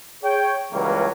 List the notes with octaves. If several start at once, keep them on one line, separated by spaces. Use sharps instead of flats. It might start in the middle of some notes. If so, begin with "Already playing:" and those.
G#4 C#5 G5
C#2 E3 F#3 G3 A#3 C#4